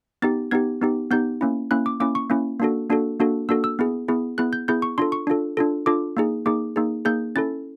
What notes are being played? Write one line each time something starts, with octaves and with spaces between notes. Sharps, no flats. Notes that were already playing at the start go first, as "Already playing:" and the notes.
B3 D#4 G4 A6
B3 D#4 G4 G#6
B3 D#4 G4
B3 D#4 G4 G6
A#3 C#4 E4
A#3 C#4 E4 F#6
D6
A#3 C#4 E4 D6
C#6
A#3 C#4 E4
A#3 D4 F#4 A4
A#3 D4 F#4 A4
A#3 D4 F#4 A4
A#3 D4 F#4 A4 E6
E6
B3 E4 G#4
B3 E4 G#4
B3 E4 G#4 F#6
G6
B3 E4 G#4 G6
C#6
D4 F4 A4 C6
C#6
D4 F4 A4
D4 F4 A4
D4 F4 A4 D6
A#3 D#4 G#4
A#3 D#4 G#4 D6
A#3 D#4 G#4
A#3 D#4 G#4 G6
C#4 E4 A4 A6